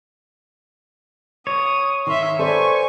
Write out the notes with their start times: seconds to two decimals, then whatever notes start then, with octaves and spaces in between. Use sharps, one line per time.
1.47 C#5 D#6
2.07 D#3 E5 C6
2.39 A4 B4 C5 D5 G#5 C#6